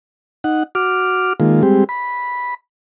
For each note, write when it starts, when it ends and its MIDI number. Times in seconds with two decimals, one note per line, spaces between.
0.44 0.63 63
0.44 0.63 78
0.75 1.33 66
0.75 1.33 86
0.75 1.33 89
1.40 1.62 51
1.40 1.62 56
1.40 1.62 58
1.40 1.62 65
1.63 1.84 55
1.63 1.84 56
1.63 1.84 60
1.63 1.84 67
1.89 2.54 83